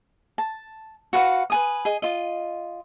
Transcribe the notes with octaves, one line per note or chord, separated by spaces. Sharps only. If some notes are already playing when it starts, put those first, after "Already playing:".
A5
F#4 B4 F5 F#5
B4 G#5 D#6
G#4 D#5
F4 D#5